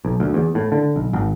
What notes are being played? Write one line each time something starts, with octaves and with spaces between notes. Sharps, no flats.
B1
D2
E2
A2
D3
B1
G#1